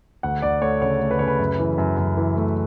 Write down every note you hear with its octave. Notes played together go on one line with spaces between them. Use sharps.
D2 F#5
D2 D5
A3 C#5
C#3 C#5
A3
B4
C#3 C#5
B4
F#2
E3
F#2
F#2
E3
A3